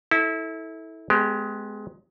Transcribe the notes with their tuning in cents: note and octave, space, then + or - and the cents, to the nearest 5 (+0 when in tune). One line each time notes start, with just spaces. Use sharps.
E4 -25 A4 +0
G#3 +20 B3 +30 G4 +0